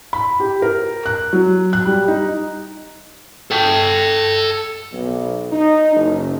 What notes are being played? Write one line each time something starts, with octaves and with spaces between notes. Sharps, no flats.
B5
G4
A#4
F#6
F#3
F#6
G3
D#4
A4 G5
B1
D#4
F#1